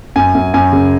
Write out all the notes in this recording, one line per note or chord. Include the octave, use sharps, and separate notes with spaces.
F#2 G#5
F#2
F#2 G#5
C#3